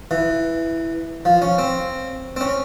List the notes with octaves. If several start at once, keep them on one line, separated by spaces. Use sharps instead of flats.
E3
F3
C#4
C4
C4
C#4